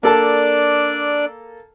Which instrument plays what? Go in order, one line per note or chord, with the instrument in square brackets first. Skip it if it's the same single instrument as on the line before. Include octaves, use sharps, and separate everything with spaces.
[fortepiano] A#3 A4 A5 [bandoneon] D4 D5